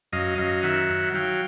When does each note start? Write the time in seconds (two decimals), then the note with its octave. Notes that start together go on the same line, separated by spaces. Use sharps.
0.12 F#2 D#5 F5
0.38 F#2 D#5 F5
0.63 D#3 E5 F#5
0.89 F#3
1.14 F#3 F5 G5